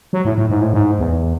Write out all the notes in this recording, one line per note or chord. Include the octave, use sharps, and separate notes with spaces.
F#3
A2
A2
G#2
A2
G#2
E2